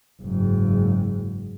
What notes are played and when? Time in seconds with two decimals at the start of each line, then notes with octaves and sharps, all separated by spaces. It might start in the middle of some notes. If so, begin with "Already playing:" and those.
0.22 F#1 G#2